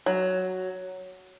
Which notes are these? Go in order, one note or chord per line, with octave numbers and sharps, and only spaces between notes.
F#3